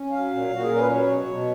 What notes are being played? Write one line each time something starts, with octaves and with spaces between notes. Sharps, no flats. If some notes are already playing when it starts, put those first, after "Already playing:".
Already playing: C#4
F#3 F5
A#2
A#2 F#4
G#4
C#4 A#4
B4
F#3 C#5
B2
B2